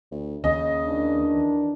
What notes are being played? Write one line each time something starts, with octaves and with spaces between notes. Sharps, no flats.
D2
D#2 C#3 D#5
D#3 E3 D4